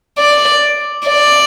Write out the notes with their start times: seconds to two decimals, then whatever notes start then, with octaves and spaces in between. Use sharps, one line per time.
0.18 D5
1.08 D5